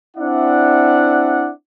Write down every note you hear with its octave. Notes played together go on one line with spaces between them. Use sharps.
C4 D4 E4 D5 E5 F#5